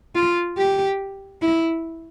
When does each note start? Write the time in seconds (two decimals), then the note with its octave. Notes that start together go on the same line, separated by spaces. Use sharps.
0.15 F4
0.58 G4
1.42 E4